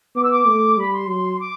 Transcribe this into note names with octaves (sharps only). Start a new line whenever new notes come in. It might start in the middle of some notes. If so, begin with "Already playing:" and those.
B3 D6
E6
D6
A3
G3 B5
C6
F#3 C6
D6